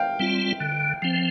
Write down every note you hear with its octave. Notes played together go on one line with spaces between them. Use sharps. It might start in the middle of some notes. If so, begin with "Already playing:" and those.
Already playing: F5 G5
G3 C4 F4
D3
F3 C4